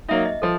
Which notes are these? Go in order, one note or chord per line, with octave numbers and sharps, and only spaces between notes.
F#3 A#3 D#4 E5
D#5
F3 A4